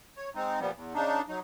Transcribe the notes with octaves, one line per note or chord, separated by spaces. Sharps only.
C#5
G#3 C4 D#4
A#2 F3 G3 B3
E2
C#3 D4 D#4
F#3 D#4